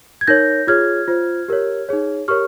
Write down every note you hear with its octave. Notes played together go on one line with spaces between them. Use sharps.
G#6
D#4 A#4 C#5 G6 A#6
F4 G#4 C#5 F6 G#6
F4 C5
G4 A#4 C#5
D#4 G#4 C#5
G4 A#4 C#5 C#6 F6